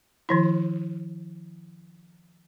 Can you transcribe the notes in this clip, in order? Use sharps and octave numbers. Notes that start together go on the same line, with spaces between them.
D#3 F3 E4